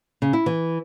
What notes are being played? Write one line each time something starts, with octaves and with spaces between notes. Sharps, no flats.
C#3
E4
E3